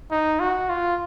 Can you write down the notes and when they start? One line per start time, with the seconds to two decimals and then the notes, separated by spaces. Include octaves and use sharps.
0.11 D#4
0.40 F#4
0.69 F4